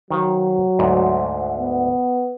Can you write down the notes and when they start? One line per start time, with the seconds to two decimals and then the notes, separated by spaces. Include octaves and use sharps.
0.11 D#3 F#3 C5 F5
0.79 D2 G#2
1.58 B3